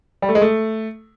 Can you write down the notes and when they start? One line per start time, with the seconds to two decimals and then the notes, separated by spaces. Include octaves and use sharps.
0.22 G3
0.29 A3
0.35 G#3
0.41 A3